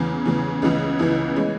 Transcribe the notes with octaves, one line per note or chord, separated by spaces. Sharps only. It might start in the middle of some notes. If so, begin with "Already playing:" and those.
Already playing: E2 C#3 E3
E2 C#3 E3
C#2 C#3 E3 B3 E4
C#2 C#3 E3 B3 E4
E3 G#3 C#4